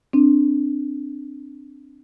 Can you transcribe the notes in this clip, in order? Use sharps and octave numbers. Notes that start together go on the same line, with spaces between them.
C4 D4